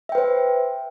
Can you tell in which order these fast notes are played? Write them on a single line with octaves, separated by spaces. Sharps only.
E5 G5 B4 C5